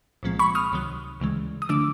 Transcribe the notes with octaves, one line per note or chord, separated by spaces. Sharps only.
C2 A#2 F3 G#3 C4
B5 C#6
D#6 F6
C#2 C3 D#3 F#3
D2 C#3 E3 G#3
D#6
D3 F3 A3 D4 D6 E6